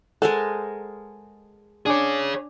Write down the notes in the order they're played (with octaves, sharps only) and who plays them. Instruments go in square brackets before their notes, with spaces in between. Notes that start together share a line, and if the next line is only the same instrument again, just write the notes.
[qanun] G#3 A#4 C5 [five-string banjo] A4 [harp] F#5
[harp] D4 G#5 D6 [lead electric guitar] G#4 C#5